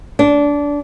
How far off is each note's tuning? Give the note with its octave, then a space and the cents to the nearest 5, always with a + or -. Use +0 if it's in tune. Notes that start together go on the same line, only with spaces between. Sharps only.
D4 -20